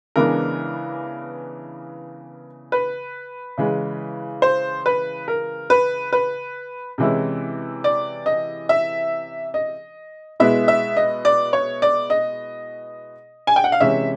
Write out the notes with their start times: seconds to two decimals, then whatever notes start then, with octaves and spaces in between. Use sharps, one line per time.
0.16 C#3 E3 G#3 B3 D4 A#4
2.72 B4
3.58 C#3 E3 G#3
4.42 C5
4.86 B4
5.28 A#4
5.70 B4
6.13 B4
6.98 C3 E3 G#3 C#4 E4
7.84 D5
8.26 D#5
8.69 E5
9.54 D#5
10.40 B2 G#3 B3 E4 E5
10.68 E5
10.97 D#5
11.25 D5
11.53 C#5
11.82 D5
12.10 D#5
13.47 G#5
13.56 G5
13.64 F#5
13.72 F5
13.80 C3 E3 G#3 C#4 E5